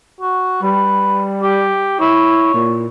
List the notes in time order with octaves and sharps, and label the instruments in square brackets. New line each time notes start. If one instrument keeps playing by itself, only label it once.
[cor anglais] F#4
[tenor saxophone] G3 [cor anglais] B4
[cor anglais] G4
[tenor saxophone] E4 [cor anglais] C#5
[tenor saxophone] A#2